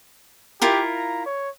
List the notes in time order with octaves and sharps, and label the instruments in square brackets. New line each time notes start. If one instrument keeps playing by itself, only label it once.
[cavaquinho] E4 F4 A#4 [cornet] G4
[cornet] A#5
C#5